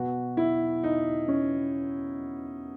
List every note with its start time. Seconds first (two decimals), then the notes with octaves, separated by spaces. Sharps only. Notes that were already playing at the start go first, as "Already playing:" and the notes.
Already playing: B2 F#4
0.37 E4
0.84 D#4
1.28 C#4